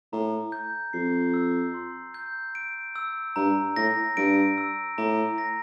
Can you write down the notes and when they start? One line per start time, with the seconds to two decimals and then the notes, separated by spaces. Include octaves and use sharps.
0.12 A2 A#5
0.52 G6
0.93 F2 C7
1.34 E6
1.74 C6
2.14 G6
2.55 D7
2.96 E6
3.36 G2 A#5
3.76 A2 A#6
4.17 G2 D7
4.58 E6
4.98 A2 A#5
5.38 A#6